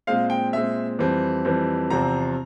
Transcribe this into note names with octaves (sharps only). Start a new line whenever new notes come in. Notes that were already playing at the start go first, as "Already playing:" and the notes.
A#2 G#3 C4 F5
G5
A#2 G#3 C4 E5
F2 E3 G3 C4
F2 E3 G3 C4
E2 C3 F3 C4 A#5